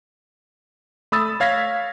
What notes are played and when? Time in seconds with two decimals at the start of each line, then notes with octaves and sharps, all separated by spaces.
1.12 A3 B5 D#6 E6 A6
1.40 C#5 F5 G#6 A#6 B6